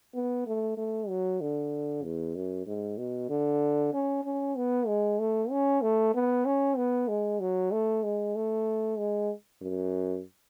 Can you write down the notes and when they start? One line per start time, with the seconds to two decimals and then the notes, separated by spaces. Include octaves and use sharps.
0.14 B3
0.47 A3
0.77 A3
1.09 F#3
1.41 D3
2.03 E2
2.36 F#2
2.67 G#2
2.98 B2
3.29 D3
3.93 C#4
4.24 C#4
4.57 B3
4.87 G#3
5.19 A3
5.51 C#4
5.82 A3
6.14 B3
6.46 C#4
6.77 B3
7.08 G#3
7.40 F#3
7.72 A3
8.03 G#3
8.35 A3
8.98 G#3
9.62 F#2